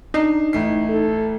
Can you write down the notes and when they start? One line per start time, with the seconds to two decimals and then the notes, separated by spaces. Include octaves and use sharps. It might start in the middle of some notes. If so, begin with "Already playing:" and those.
0.14 D4 D#4 C7
0.53 A1 A3 C7
0.89 A4